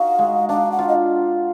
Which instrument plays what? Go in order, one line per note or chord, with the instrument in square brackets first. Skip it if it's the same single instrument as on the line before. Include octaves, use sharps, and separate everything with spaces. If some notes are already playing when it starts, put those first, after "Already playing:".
Already playing: [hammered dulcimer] D#4 F#4 A#4 [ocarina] F5
[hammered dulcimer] G#3
[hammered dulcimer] D4 [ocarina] F5
[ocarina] F#5
[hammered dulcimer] F4
[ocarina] D#5